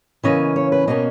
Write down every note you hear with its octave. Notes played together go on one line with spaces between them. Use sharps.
C#3 E3 A#3 C#4 D#5
C#5
B4
B2 A#3 C#4 D#5